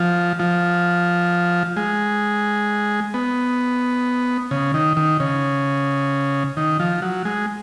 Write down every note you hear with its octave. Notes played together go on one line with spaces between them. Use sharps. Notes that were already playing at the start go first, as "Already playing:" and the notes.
Already playing: F3
F3
G#3
B3
C#3
D#3
D#3
C#3
D#3
F3
F#3
G#3